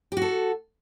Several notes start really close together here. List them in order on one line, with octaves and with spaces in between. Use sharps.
G4 F#4 A4